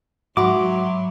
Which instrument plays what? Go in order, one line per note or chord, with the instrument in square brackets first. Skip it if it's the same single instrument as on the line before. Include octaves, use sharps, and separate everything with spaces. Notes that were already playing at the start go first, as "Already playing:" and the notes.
[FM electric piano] G#2 F#4 [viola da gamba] F#3 [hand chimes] E5 B5 C6 [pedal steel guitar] D6